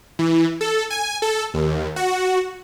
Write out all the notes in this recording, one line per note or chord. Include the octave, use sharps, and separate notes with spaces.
E3
A4
G#5
A4
D#2
F#4